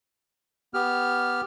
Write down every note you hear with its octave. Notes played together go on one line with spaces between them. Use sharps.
B3 G4 F6